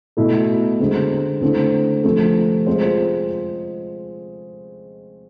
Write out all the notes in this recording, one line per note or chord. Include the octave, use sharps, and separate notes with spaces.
B2 A3 E4
D3 G#3 C4
D3 A3 C4 E4
C3 F3 A3 C4
G#3 C4 F4 G#4 C5